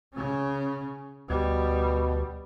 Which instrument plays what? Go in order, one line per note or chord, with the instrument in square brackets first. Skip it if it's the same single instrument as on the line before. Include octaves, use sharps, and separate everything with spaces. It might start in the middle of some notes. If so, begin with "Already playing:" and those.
[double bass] C#3 C#4
[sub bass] D2 [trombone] B2 [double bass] G3